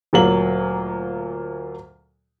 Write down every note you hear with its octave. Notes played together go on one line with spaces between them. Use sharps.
D2 A#2 F#3 A#3 F#7